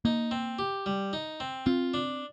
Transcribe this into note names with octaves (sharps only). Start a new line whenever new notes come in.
A#3 D#4
C4
G4
G3
D#4
C4
C4 F4
D4